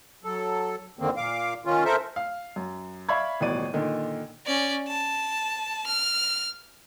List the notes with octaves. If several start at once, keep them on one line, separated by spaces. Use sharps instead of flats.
F#3 A4
F2 D3 D#3 A#3 C4
A#2 F5 D6
D#3 C#4 F4
A4 A#4 C5 E5
F5
F#2
D5 E5 F5 B5 C#6 G#6
D#1 A1 B2 D5 D#7
A#2 D3 D#3
C#4 D5
A5
F6